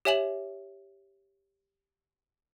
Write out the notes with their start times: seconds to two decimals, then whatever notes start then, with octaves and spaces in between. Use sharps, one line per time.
0.05 G4 C#5 E5 G#5 E7 F#7